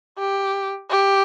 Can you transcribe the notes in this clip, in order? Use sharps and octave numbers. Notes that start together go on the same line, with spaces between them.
G4
G4